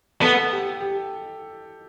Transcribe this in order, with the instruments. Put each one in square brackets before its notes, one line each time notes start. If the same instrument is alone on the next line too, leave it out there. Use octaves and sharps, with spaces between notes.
[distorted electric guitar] B3 [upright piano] A4
[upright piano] G4
G4